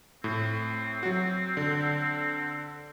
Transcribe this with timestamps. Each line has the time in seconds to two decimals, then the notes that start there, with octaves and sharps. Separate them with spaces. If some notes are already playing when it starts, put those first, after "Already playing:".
0.24 A2 C4
1.03 F#3 F#4
1.57 D3